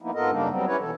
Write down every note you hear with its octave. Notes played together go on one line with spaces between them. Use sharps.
F3 A#3 B3 D#4 E4
G#2 B3 F4 A4 A#4 D#5
F#2 C#3 G3 A#3 D4 D#4
F#3 G3 B3 C4
C#4 E4 G4 B4 C#5
B2 E3 A4